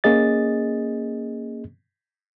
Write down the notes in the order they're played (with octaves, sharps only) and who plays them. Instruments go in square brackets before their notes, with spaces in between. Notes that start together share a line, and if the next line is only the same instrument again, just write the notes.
[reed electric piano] A#3 C#4 G#4 D#5 A6